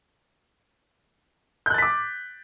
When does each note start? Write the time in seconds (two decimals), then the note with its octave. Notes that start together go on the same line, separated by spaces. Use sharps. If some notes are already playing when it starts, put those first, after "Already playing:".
1.66 G6
1.70 F#6
1.74 A6
1.78 B6
1.82 D6